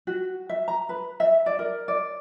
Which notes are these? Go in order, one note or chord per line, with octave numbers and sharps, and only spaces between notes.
F#4
E5
A#5
B4
E5
D5
A#4
D5